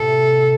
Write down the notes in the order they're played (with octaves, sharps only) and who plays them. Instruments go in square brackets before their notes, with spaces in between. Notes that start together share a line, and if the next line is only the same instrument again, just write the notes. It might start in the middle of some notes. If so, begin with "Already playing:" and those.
Already playing: [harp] A2 C3 [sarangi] A4